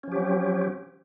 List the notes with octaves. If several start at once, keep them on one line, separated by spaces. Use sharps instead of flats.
F3 F#3 C4 C#4 G4